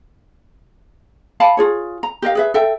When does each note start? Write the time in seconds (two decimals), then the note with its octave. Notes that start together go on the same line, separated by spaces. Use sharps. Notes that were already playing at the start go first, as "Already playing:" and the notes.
1.40 F5 A5 B5
1.57 F4 G#4 C#5
2.03 A#5
2.22 G4 A#4 D#5 F5
2.35 G#4 B4 E5
2.54 A4 E5 G5